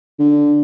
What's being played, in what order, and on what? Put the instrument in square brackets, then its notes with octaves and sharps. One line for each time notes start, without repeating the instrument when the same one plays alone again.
[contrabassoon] D3